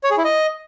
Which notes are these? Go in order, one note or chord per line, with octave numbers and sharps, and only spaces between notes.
C#5
G#4
E4
D#5